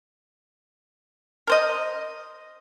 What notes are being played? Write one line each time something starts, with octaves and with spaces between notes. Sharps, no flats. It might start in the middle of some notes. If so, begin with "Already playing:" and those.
A#4 C5 D#5